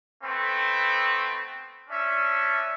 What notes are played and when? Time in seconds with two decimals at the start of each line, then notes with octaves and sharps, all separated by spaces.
0.23 A3 B3 C4
1.90 C#4 D4 E5